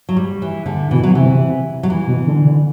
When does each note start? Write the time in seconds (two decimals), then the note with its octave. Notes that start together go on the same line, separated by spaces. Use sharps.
0.09 F#3
0.17 G3
0.42 E3
0.66 D3
0.91 B2 E3
1.03 F#3
1.15 C3 E3
1.83 F#3
1.90 E3
2.08 B2
2.27 D3
2.45 D3